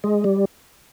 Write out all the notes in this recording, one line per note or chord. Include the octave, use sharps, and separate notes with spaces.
G#3
G3